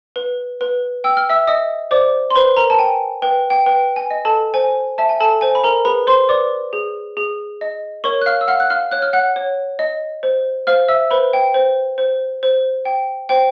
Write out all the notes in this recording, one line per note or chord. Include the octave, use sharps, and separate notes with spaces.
B4
B4
G5 E6
F6
E5 E6
D#5 E5 D#6
C5 D5 D6
C6
B4 C5 B5
A#4 A#5
A5
G5 G#5
B4 G5
G5
B4 G5
G#5
D#5
A4 A5
C5 G#5
E5 A5
G#5
A4 A5
C5 G#5
B5
A#4 A#5
G#4 B4 B5
C5 C6
B4 D5 D6
G#4
G#4
D#5
A#4 C#5 C#6
F#6
F5 F6
E6
F5 F#5 F6
F#6
F5 F6
C#5 F#6
F6
F#5 F#6
C#5
D#5
C5
C5 F5 F6
E5 E6
B4 C5 B5
G5
C5
C5
C5
G5
C5 G5